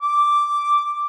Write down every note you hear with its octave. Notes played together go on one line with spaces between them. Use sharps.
D6